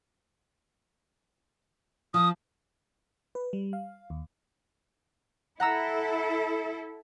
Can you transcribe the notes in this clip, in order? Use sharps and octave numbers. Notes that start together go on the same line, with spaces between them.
F3 D#6
B4
G3
F5
D#2
E4 A4 F#5 A#5 E6